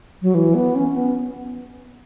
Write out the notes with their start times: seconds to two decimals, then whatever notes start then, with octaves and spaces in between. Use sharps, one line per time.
0.22 F#3
0.35 E3
0.55 B3
0.75 C#4
0.96 B3